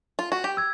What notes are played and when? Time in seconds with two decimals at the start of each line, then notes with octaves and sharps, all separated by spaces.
0.19 F4
0.32 F#4
0.44 G4
0.57 E6 G#6